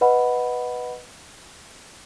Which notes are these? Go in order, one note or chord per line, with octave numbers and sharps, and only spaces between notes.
B4 D#5 F#5 B5